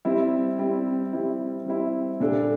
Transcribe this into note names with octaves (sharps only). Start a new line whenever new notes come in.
G3 C4 E4
G3 C4 E4
G3 C4 E4
G3 C4 E4
A#2 G3 D4 A4